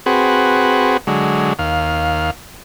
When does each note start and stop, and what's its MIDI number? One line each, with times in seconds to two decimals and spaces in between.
0.06 0.97 60
0.06 0.97 66
0.06 0.97 68
0.06 0.97 71
1.07 1.53 50
1.07 1.53 54
1.07 1.53 56
1.59 2.31 39
1.59 2.31 77